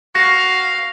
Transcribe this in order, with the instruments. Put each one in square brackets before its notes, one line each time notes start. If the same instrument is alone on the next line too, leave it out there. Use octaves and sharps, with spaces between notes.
[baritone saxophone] F#4 [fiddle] F5 [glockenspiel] A#6